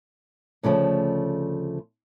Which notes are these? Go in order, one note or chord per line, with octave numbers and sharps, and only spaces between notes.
D2 C#3 F3 A3